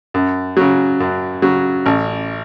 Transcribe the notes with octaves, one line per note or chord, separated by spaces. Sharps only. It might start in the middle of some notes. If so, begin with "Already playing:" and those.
F#2
C#3 F#3
F#2
C#3 F#3
A1